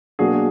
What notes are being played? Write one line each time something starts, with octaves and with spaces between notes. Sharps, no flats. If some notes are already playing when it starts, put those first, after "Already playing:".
B2 F#3 A#3 D4 F#4 G#4